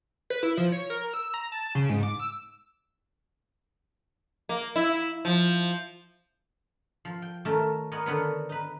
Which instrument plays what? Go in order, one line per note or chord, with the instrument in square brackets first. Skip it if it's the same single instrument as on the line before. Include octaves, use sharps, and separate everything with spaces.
[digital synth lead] B4
E4
F3
C#5
A#4
E6
A#5
A5
C#3
G#2
D6
E6
[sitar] A#3
E4
F3
[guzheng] F3
G5
D#3 A3 C#4 A#4
B3 A#4 C#5 D#5
D3 D#3 B3 A#4 B4 C#5
D#4 B4